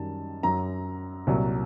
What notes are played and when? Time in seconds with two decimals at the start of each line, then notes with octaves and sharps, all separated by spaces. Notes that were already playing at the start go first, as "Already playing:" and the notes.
Already playing: F#2 D#3 G3 A5
0.43 F#2 F#3 A#5
1.27 C2 A#2 F#3